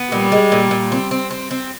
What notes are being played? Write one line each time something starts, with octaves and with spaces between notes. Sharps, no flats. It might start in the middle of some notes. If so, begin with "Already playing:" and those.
Already playing: B3
A#2 G3
G#3
A#2
A#2
C4
C4
C4
C4